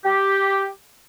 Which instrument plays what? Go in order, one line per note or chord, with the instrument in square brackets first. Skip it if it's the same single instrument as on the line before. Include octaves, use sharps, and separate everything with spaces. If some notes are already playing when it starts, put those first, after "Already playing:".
[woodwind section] G4